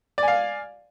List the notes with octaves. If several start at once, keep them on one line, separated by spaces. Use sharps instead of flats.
D5 F5 G#5